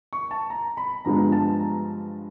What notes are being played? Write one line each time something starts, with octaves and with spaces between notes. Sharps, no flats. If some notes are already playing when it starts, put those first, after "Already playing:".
C#6
A5
A#5
B5
G2 D3 F3 G#3 B3 A#5
A5
A#5